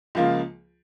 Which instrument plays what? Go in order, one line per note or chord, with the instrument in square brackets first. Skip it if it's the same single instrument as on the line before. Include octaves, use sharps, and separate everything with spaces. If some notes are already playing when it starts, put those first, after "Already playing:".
[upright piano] C#2 C#3 F3 A#3 F4